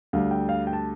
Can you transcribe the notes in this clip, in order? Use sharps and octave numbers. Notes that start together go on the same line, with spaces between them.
D2 D3 G3 F5
G5
F5
G5
A5